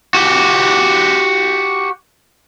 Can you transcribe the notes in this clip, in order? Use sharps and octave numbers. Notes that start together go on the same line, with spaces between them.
F#4 G4